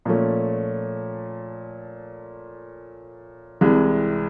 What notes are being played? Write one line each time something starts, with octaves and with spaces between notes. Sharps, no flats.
A#2 F3 A3 C#4
C2 C3 E3 G#3